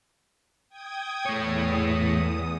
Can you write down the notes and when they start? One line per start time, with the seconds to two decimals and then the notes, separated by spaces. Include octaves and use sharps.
0.69 G5 D#6 G#6
1.26 E2 A3 C#5 D#6